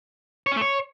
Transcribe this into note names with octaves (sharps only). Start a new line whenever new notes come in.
C#5
C#4
A3
C#5